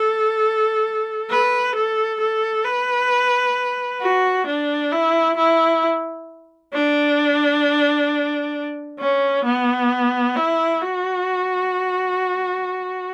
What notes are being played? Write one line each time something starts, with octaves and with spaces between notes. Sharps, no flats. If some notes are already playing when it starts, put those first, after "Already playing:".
Already playing: A4
B4
A4
A4
B4
F#4
D4
E4
E4
D4
C#4
B3
E4
F#4